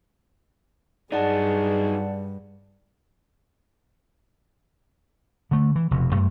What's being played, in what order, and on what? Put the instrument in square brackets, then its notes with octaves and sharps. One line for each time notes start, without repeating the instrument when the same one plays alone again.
[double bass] G2 [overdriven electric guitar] F#3 D#4 [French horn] G#4 [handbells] D5 F#5 A5
[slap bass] D3 A3
E3
F1 F2 B2
F#2 A3